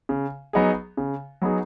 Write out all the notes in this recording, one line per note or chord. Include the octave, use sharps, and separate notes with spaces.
C#3
F#3 B3 D#4 G#4
C#3
F#3 B3 D#4 G#4